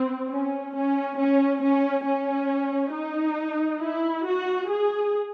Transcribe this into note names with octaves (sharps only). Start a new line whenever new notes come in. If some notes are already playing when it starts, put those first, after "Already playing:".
Already playing: C4
C#4
C#4
C#4
C#4
C#4
D#4
E4
F#4
G#4